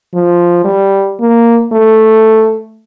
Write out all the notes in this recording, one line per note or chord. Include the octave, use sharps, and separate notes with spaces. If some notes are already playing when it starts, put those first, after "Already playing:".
F3
G3
A#3
A3